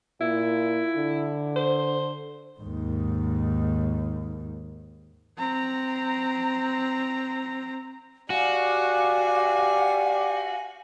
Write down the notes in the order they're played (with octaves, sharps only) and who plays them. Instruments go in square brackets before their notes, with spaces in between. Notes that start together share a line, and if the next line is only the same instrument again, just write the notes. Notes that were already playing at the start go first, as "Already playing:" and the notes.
[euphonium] A#2 [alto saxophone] E4
[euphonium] D3
[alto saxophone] C5
[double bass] D#2 G#2
[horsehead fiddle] C4 A#5
[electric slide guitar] F#4 [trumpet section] G4 D5 [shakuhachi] F5 [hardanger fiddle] G#5